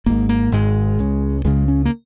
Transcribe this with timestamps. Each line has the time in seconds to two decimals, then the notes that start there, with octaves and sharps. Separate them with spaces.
0.06 G#1 G#2 A#3
0.29 A#3
0.52 G#1 G#2 G#3
0.99 C#2 C#3
1.45 C#2 C#3 G#3
1.68 C#4
1.85 A#3